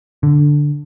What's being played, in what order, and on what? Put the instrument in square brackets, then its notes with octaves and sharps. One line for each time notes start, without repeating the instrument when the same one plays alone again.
[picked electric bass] D3